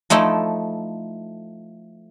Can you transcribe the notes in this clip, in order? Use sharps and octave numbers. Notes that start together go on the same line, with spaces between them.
F3 A3 D#4 E4